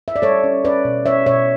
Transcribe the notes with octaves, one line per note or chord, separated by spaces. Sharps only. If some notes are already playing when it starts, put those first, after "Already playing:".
E5
D5
G3 A4 C#5
C#4
C#4 B4 D5
B2
C#4 C#5 E5
B2 C#5 E5